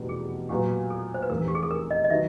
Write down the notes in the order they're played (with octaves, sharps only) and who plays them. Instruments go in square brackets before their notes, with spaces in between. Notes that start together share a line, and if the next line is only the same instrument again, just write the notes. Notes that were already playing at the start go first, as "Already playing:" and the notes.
Already playing: [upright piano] F1 E2 B2 G3 B3
[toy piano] G#4
[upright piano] A#2 F#3 B3 [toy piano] G4
[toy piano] A4
C5
B4
[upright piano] F1 E2 C3 E3 [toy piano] A#4
[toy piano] G4
G#4
A4
A#4
D#5
D#5
[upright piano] D#3 F#3 B3 [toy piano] E5